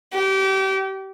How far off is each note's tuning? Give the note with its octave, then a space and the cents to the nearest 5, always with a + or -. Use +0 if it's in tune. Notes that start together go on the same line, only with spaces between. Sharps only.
G4 -30